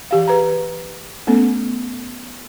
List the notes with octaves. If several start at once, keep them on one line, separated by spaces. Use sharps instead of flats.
E3 G4 F5
G#4 B4 A#5
A3 B3 C#4 A4